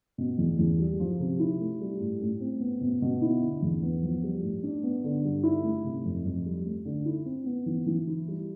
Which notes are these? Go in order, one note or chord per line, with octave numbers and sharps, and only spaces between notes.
B2
E2
E2
G3
F3
C3
E4
A3
G3
A2
A2
C4
B3
B2
B2
E4
D3
E2
B3
F3
G3
A2
D4
B3
D3
G2
E4
A3
C3
F2
F2
G3
A3
D3
E4
C4
B3
E3
E3
E4
G3